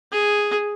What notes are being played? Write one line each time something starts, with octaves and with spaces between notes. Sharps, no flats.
G#4